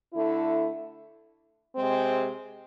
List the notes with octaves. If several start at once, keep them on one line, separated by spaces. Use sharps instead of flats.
D3 A3 E4
C3 G#3 C4